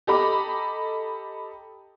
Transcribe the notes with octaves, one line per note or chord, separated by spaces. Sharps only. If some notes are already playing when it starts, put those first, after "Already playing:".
G4 A4 D#5 A#5 B5 D6